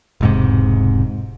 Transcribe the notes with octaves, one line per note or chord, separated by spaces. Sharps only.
E1 G#2 C3